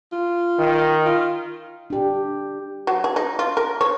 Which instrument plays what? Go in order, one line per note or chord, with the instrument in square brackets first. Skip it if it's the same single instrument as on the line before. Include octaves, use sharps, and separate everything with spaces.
[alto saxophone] F4
[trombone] D#3
[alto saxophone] F4
[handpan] D4 G4
[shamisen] F#3
G#4
D#4
F4
A#4
C#5